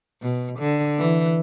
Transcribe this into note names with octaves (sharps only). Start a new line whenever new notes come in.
B2
D3
E3